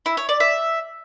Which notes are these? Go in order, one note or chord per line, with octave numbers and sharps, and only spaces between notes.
E4
C#5
D5
E5